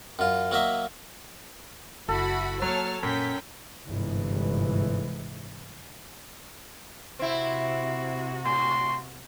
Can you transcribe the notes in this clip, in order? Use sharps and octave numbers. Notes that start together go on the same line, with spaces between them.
F#2 F4
F#3 A#3 D#5 E5
F#1 E4 F#4 A4 B5
F#3 A3 A#3 C#5 A5 F6
F#2 A#2 C#4 G5 B6
G1 G#2 C3 E3
C3 C4 E4 F#4
A2 C6